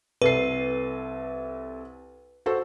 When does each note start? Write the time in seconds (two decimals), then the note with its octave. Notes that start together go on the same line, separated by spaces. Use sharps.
0.22 C2 A4 B4 C7
2.46 F#4 A4 C5